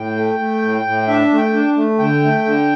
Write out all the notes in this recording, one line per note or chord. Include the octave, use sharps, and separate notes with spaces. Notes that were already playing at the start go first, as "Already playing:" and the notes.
Already playing: A2 G5
A3
A3
A2
A2
D4 E5
A3
G5
D4
A3
D3 G5
A3
D3